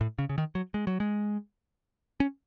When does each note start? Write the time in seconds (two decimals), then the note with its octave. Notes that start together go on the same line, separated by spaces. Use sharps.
0.01 A2
0.19 C#3
0.29 C#3
0.38 D#3
0.55 F#3
0.74 G#3
0.87 F#3
1.00 G#3
2.20 C#4